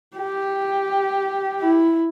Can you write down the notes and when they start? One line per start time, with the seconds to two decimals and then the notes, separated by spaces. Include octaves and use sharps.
0.17 G4
1.61 E4